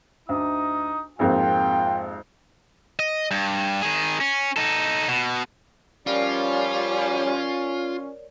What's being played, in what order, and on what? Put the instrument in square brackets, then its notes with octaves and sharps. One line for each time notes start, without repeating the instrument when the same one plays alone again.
[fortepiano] D2 [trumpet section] D#4 D#6
[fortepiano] G#1 F2 A#3 [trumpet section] F4 G5
[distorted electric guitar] D#5
G2
D#3 G#4
C#4
D#4 A4
B2
[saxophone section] F3 G3 [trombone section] C#4 [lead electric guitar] F4 [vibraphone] A#4 C#5 D5